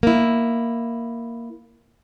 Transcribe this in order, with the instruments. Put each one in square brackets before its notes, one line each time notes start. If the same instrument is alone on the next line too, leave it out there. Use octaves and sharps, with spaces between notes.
[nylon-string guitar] A#3 E4